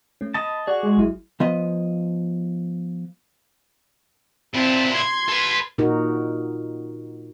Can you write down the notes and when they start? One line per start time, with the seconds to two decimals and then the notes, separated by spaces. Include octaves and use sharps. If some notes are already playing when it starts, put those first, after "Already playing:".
0.21 A3 C#4
0.34 D#5 A5 B5
0.67 F#4 G#4 D5 F#5
0.83 G#3
0.97 G#1 F#3 E4
1.40 F3 B3 D#5
4.54 A#2 C4 E4 A5
4.94 C6 G#6
5.28 A4 B4
5.78 A#2 D#4 F#4 A#4